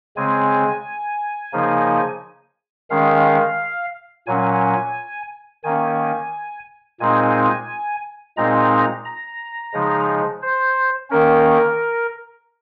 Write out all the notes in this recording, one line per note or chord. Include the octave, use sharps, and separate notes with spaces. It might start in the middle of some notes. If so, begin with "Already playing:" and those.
C#3 G#3 C4 G#5
C#3 F3 A#3 D#4
D#3 G#3 C#4 F5
A#2 F#3 C#4 G#5
D#3 A#3 C#4 G#5
A#2 G#3 C4 D#4 G#5
A#2 G#3 C4 D#4 A#5
A#5
C#3 F3 G#3 D#4
C5
D#3 A#3 C#4 A#4